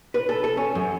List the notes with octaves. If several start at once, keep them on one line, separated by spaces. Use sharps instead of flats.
B4
A4
A4
C#4
F#2